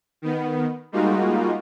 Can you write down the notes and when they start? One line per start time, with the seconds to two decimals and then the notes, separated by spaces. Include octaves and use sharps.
0.22 D#3 B3
0.92 G3 G#3 A#3 D#4 F4 F#4